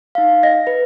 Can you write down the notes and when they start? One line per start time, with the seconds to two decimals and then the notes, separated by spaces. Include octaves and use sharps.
0.15 D#4 F5
0.43 D#5 A#6
0.67 B4